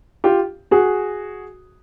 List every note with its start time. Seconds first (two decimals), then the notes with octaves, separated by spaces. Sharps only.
0.24 F4 G4
0.71 F#4 G#4